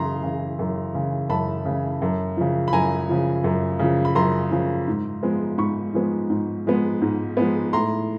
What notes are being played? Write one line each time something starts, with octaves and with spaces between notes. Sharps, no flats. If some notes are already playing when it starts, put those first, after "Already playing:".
Already playing: F#2 C#3 E3 A#5 C6
C#3 E3
F#2
C#3 E3
F#2 A5 B5
C#3 E3
F#2
C#3 F3
B5
F#2 G#5 A#5
C#3 F3
F#2
C#3 F3
B5
F#2 A#5 C6
C#3 F3
G#2
F3 G#3 B3
G#2 B5 C#6
F3 G#3 B3
G#2
F3 G#3 B3
G#2
F3 G#3 B3
A2 A#5 C6